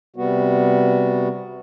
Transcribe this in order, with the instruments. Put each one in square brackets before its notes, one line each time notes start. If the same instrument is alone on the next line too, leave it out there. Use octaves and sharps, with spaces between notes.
[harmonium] C3 G3 B3 F#4